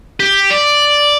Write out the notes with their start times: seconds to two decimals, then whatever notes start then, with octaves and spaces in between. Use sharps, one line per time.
0.20 G4
0.50 D5